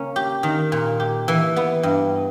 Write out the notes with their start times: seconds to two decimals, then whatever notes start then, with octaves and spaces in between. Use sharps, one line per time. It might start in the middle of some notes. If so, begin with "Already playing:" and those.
Already playing: C#3 A#3 C#4
0.16 G4
0.43 D#3
0.72 A#2
1.00 G4
1.28 E3
1.56 B3
1.83 G2